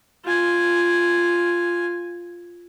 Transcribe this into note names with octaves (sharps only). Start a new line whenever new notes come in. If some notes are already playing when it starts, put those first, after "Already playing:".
F4 G#5